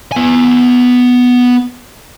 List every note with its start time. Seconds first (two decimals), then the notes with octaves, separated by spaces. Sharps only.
0.12 B3 G#5